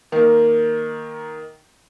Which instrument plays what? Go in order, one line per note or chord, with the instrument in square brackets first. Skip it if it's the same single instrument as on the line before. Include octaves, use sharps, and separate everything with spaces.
[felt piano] D#3 A#3